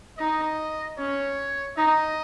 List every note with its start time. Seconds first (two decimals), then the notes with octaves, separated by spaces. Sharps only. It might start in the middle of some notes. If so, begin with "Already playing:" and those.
0.18 D#4 D#5
0.98 C#4 C#5
1.77 D#4 D#5